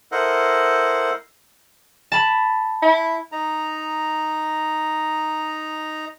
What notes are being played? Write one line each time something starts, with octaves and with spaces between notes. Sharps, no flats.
E4 A4 A#4 C5 D#5 F#5
A5 B5
E4
D#4 A#5